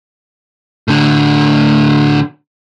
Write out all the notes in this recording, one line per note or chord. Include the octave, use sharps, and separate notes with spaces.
A2 D3